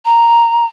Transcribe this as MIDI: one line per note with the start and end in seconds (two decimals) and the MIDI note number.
0.05 0.66 82